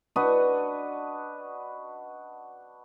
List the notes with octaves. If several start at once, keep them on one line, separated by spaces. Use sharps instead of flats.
D4 F#4 B4 D#5